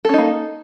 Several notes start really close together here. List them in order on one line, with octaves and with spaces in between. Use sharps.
A4 C#4 D#4 A#3